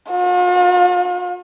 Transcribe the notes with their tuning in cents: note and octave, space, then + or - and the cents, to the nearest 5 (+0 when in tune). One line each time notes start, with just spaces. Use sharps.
F4 +45